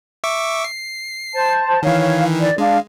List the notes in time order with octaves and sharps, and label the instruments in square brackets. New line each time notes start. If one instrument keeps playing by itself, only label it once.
[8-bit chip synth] E5 C#6 D6
C7
[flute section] C5 A5
[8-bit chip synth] D#3 E3 [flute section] C#5 F5
[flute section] D5
[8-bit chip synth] G#3 [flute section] D4 F5